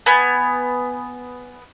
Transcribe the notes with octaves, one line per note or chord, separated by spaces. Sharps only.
B3 G#5